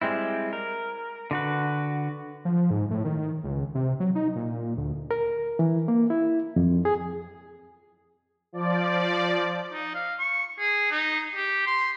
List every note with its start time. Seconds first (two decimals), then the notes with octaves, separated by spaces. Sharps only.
0.02 G3 G#3 C4 E4
0.53 A#4
1.31 D3 F#4 B4
2.45 F3
2.71 G#2
2.91 A2
3.05 D#3
3.44 C#2
3.75 C3
4.00 F#3
4.15 D#4
4.35 A#2
4.77 D2
5.11 A#4
5.59 E3
5.88 A#3
6.10 E4
6.56 F2
6.85 G#4
8.53 F3 D5
9.73 D#4
9.95 F5
10.19 C#6
10.59 G#4
10.91 D#4
11.35 G4
11.67 C6